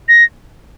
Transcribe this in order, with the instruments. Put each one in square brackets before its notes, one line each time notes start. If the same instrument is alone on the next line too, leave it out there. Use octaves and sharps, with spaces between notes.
[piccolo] A#6